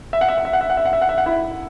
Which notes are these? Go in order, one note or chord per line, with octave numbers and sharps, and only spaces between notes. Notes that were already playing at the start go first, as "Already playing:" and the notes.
E5
F#5
E5
F#5
E5
F#5
E5
F#5
E5
F#5
E5
F#5
E5
F#5
E4 E5